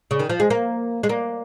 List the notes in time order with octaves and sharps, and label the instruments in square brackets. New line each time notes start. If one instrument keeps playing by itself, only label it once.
[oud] C#3
D#3
F3
G#3
A#3
G#3
A#3